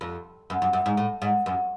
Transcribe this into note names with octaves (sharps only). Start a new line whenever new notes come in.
F2
F#2
F#2
F#2
G#2
A2
G#2
F#2